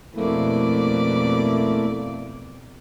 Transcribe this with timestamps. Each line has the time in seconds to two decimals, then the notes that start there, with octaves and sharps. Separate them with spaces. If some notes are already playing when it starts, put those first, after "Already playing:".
0.15 F2 B2 A3 A#3 E4 D5